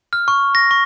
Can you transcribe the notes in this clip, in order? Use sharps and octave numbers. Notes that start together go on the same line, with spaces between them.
F6
C#6
A#6
C#6